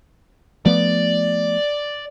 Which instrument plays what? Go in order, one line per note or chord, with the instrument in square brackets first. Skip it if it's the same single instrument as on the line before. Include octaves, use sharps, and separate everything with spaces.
[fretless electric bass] F3 A3 B3 [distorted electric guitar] D5